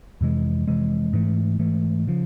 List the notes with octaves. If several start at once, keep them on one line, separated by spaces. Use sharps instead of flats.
F2 C3 E3 G#3
F2 C3 E3 G#3
G#2 E3 A3
G#2 E3 A3
C#3 F3